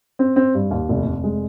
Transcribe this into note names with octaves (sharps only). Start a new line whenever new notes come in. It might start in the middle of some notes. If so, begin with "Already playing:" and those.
C4
C4
G2
D#2
F1
F1
G#3